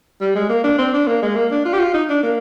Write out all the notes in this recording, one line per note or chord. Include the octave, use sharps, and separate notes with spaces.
G3
G#3
A#3
D4
C4
D4
A#3
G#3
A#3
D4
F4
G4
F4
D#4
D4
A#3